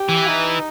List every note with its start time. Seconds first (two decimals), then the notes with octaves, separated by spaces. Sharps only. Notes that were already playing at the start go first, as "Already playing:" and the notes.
Already playing: G4
0.09 E3
0.27 D#4